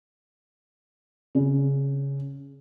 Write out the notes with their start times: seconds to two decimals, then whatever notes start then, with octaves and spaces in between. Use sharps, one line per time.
1.35 C#3